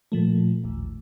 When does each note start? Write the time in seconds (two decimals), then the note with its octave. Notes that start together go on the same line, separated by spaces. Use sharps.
0.12 A#2 F3 A3
0.64 A1 D#2